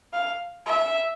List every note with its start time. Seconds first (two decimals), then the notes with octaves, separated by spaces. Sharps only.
0.13 F5
0.66 E5